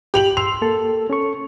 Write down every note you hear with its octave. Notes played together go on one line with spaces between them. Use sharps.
G4 F7 F#7
C6 E6 F7
A#3 A4
C#4 A4 C#6